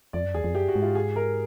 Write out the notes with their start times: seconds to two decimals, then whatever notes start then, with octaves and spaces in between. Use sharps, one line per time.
0.13 F2 D5
0.24 F#2
0.34 E2 G#4
0.44 F2
0.54 F#2 G4
0.68 F#4
0.75 G#2
0.82 F4
0.95 G#4
1.16 A#4